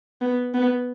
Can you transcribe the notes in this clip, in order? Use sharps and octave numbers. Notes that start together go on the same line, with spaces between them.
B3
B3